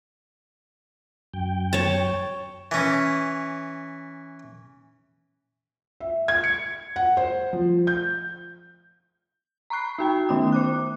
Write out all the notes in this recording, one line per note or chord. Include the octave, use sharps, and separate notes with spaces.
F#2 G5
C#5 A5
E3 C#4
E5
G#6
C#7
F#5
C5
F3
G6
A#5 B5 C#6 F#6 C7
D#4 F#4 G5
D#3 A3 B3 C#4 D#6
C5 D6 F#6